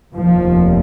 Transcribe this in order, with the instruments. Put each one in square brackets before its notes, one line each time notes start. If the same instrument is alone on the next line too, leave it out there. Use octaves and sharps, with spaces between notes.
[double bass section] F1 D#2 F3